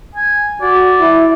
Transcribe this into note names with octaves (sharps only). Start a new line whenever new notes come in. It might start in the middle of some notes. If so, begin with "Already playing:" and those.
G#5
F#4 D5
E4